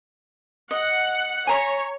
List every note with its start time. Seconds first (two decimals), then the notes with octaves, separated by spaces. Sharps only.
0.71 D#5 F#5
1.47 C#5 G#5 A#5 B5